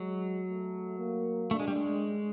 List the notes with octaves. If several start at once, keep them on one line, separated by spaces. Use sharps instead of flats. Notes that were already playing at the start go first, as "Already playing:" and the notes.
Already playing: F#3 G#3
A3
A#3
A3 D4
G#3
G3
G#3